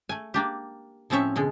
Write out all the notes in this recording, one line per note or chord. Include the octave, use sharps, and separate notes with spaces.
A3 G#5
A#3 D4 G4
A2 F3 C4 C#4 C#5 E5
B2 D3 G#3